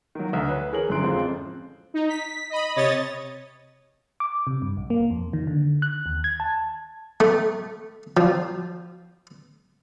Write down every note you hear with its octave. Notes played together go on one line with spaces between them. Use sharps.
D#3 F#3
D2
B4 C#5
E3 G#4 A#4 C#5 F#7
G1 F#2 E4 C6 F#6 D7
F2 A2 C#3 G#3 C4 F4
D#4
B6
D#5 B5
C3 C#5 D#5 D#6 A6
D6
C3
G2
B1
A#3
F2
D#3
D3
F#6
D#2
G#6
A5
A3
F3